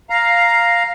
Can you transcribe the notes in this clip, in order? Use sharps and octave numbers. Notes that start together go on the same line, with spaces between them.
F5 A#5